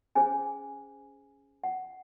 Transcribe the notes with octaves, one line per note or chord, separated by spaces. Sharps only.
C#4 G#4 C5 G#5
F#5